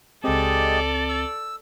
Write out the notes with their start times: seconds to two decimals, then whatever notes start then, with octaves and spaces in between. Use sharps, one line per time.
0.24 C#2 G#3 C4 G4 A4 D5 D#5
1.09 E6